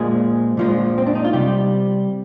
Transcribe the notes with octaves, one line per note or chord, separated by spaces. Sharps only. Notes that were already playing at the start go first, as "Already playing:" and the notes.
Already playing: A#2 F3 G#3 G#4
A#2 F3 G#3
C4
D4
D#4
F4
C3 G3 G4